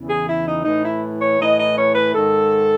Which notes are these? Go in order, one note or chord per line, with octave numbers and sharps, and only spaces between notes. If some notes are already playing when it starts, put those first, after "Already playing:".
Already playing: E2 C#3 E3
G#4
E4
D#4
A2 E3 D#4
E4
C#5
A2 E3 D#5
D#5
C#5
B4
G#2 D#3 A4